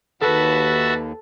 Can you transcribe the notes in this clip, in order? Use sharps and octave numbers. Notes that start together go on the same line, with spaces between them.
D#2 F#4 A4 B4 E5 A5